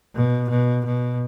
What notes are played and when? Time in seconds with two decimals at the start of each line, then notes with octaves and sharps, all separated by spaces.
0.15 B2
0.49 B2
0.85 B2